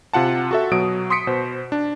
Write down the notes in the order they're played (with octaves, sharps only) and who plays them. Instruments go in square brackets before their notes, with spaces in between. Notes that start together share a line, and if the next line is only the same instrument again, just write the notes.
[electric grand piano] C3 F4 F#5 A5
F#4 A4 E5
B2 F#3 D#6 D7
C6 D#6 B6 C#7 D7
B2 C5
D4